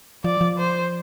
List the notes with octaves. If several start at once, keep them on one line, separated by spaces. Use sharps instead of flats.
F3 D5
F3
C5